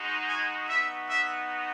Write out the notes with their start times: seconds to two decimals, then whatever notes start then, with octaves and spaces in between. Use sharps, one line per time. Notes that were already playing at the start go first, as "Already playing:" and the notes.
Already playing: G#3 D#4 F#4
0.27 G#5
0.68 B3 D#4 F#4 E5
1.10 E5